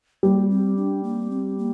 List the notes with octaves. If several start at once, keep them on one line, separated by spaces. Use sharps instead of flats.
G3 A#3
C4
D4
A#3
C4
A#3